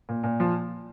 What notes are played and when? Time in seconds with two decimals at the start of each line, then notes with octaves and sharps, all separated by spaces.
0.09 A#2
0.24 A#2
0.40 F3